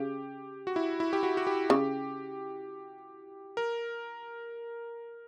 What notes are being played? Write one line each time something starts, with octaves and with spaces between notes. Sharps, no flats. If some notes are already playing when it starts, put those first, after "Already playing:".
Already playing: C#3 G4
F#4
E4
E4
G4
F#4
F#4
G4
C#3
A#4